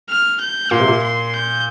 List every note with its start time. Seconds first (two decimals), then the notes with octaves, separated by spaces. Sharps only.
0.09 F6
0.41 G6
0.71 A#2 C6
0.80 C3
0.88 A#2
1.03 C6
1.34 G6